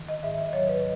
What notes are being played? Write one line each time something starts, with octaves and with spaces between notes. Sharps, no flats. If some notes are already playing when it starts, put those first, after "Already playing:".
Already playing: D#3
D#5
G#2 E5
D#5
F#3 C#5
B4